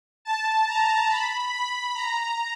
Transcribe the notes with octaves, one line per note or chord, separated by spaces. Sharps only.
A5
A#5
B5
B5
A#5